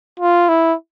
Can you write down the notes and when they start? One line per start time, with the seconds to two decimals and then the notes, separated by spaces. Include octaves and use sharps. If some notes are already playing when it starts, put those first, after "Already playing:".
0.20 F4
0.49 E4